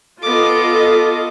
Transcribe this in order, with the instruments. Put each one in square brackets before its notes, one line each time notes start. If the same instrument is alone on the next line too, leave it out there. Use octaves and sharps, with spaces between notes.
[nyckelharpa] B3 D6 [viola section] F4 A4 D#5